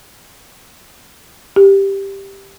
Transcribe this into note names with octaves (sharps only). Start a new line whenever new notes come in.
G4